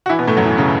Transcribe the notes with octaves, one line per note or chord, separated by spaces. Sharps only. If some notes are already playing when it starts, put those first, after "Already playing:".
F#4
E3 E4
B2 B3
A2 A3
F#2 F#3
E3
C#3